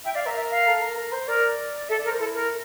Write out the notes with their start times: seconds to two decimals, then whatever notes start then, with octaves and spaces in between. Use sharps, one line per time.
0.05 E5 G5
0.15 D5 F5
0.25 A#4 E5
0.36 E5
0.51 F5
0.67 A4
0.81 A#4
0.97 A#4
1.12 C5
1.27 A#4 D5
1.89 A4 E5
1.99 D5
2.05 A#4
2.09 C5
2.20 E4 A4
2.34 A#4